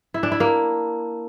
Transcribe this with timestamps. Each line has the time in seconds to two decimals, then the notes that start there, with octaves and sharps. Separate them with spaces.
0.14 E4
0.23 D4
0.32 E4
0.40 A#3